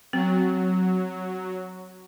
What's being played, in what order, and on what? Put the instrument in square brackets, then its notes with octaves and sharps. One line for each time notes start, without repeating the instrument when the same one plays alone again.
[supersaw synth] F#3 [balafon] C4